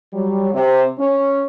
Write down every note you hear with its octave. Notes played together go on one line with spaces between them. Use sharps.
F#3 G3
C3
C#4